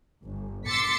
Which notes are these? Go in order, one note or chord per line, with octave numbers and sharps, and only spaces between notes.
G1
C6 D6 E6 A6 B6 C#7